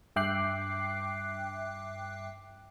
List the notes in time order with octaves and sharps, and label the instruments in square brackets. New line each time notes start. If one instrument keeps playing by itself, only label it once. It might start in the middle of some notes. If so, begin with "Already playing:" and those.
[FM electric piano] G2 E5 G5 D6 F#6 C7